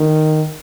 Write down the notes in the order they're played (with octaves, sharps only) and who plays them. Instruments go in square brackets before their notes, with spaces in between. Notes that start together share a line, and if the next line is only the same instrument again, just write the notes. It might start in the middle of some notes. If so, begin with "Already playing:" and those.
Already playing: [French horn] D#3